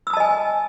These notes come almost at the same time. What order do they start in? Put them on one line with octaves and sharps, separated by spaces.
E6 D#6 A5 D#5 G#5